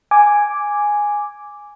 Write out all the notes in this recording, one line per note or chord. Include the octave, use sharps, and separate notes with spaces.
G#5 D6